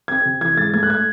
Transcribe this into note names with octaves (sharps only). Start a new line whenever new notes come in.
C4 G#6
C3
E3 G#6
G#2 A6
A3 G#6
F#6
G#6